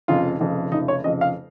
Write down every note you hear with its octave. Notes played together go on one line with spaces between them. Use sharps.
F1 F2 C#3 F4
F1 F2 C#3
F1 F2 C#3 D#4
C#5
F1 F2 C#3 D#5
F5